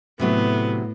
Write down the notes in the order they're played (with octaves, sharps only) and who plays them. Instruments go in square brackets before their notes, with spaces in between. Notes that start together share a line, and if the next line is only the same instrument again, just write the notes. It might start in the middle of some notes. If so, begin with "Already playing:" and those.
[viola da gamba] A2 [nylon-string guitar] C3 F#3 A3 [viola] B3